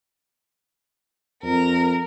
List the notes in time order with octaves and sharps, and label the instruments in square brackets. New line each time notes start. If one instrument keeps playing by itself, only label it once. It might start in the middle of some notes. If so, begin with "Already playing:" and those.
[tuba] F2 [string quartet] A#4